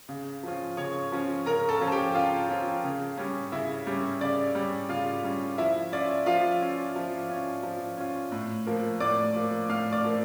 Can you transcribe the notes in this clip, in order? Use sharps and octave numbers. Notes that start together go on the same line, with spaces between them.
C#3
F3 C#4 F4
C#3 C#5 C#6
F3 C#4 F4
C#3 A#4 A#5
A4 A5
F3 C#4 F4
A5
G4 G5
C#3 F4 F5
F3 C#4 F4
C#3
G3 C#4
C#3 E4 E5
G3 C#4
C#3 D5
G3 C#4
C#3 F4 F5
G3 C#4
F3 E4 E5
C#4 F4 D5
F3 F4 F5
C#4 F4
F3
C#4 F4
F3
C#4 F4
A2
F3 A#3
A2 D5 D6
F3 A#3
A2 F5 F6
D5 D6
F3 A#3